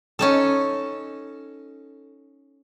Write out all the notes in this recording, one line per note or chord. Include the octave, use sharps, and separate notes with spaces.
C#4 D#4 A4